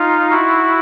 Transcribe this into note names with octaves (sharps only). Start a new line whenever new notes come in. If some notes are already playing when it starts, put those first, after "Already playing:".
Already playing: D#4 F4
E4 F#4